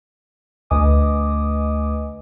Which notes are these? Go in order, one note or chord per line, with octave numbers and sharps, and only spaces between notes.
D2 B4 D#5 G#5 D6 D#6